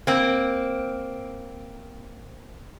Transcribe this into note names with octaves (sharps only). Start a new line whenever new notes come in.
A#3 C4